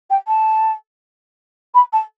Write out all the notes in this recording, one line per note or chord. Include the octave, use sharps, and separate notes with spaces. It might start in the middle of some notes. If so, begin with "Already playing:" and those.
G5
A5
B5
A5